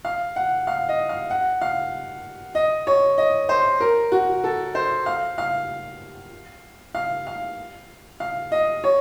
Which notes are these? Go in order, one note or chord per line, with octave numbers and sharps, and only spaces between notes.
F5
F#5
F5
D#5
F5
F#5
F5
D#5
C#5
D#5
C5
A#4
F#4
A4
C5
F5
F5
F5
F5
F5
D#5
C#5